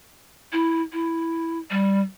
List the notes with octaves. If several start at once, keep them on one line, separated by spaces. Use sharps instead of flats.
E4
E4
G3